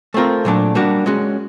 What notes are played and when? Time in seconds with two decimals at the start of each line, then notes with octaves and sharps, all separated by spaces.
0.14 A3 C4 F4 A#4
0.45 A#2 F#3 A3 D4
0.75 G3 A#3 D4 F#4
1.06 G#3 C#4 F#4